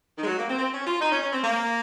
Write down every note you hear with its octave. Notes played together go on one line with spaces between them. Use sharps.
D#3
G#3
F#3
A#3
C4
C4
C#4
F4
D#4
C#4
C#4
C4
A#3